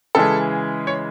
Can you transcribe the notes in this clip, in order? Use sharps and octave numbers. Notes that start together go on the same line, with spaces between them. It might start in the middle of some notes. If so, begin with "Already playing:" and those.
C#3 E3 G#3 A4
C#5